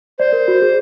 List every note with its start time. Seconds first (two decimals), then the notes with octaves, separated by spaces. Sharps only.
0.18 C5 D5
0.33 A#4
0.48 F#4
0.62 G#4